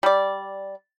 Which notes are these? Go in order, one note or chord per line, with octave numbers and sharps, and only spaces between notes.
G3 D5